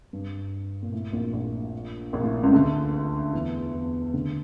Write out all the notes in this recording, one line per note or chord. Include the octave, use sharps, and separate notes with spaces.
G2
A#2
A2
A#1 A#2
A#1 A#2
A#1 A#2
A2
C#2 C#3
D2 D3
E2 E3
E2 E3
D2 D3